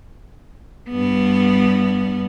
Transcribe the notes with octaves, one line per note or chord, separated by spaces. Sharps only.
G2 B3